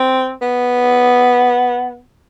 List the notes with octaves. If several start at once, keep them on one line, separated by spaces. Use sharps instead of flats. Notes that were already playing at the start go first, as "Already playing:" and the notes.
Already playing: C4
B3